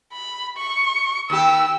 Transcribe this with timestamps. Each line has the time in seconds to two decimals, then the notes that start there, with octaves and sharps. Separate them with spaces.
0.12 B5
0.57 C#6
1.30 D#2 G4 E6